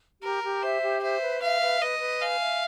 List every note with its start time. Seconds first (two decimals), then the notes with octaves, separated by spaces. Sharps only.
0.22 G4 A#4
0.43 G4
0.63 C5 E5
0.82 G4
1.02 C5 E5
1.22 B4
1.42 E5 F5
1.62 B4
1.81 B4 D#5
2.01 B4
2.21 F5 G#5
2.41 E5